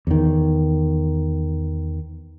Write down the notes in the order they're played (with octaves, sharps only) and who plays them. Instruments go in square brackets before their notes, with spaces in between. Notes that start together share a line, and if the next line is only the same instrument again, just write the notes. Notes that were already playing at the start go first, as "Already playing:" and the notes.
[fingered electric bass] E2 D#3